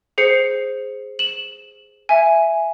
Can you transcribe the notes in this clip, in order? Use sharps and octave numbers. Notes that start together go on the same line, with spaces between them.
G#4 C5 C7 C#7
E7 F#7
E5 G#5